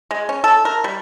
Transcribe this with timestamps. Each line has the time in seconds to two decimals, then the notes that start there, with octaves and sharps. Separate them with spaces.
0.11 G#3
0.29 C#4
0.44 A4
0.65 A#4
0.84 G3